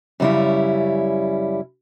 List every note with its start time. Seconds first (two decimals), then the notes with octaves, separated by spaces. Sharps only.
0.20 F#2 C#3 G3 C#4 E4